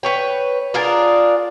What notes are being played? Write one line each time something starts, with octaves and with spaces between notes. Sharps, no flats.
B4 C#5 G5
D4 F4 G#4 A#4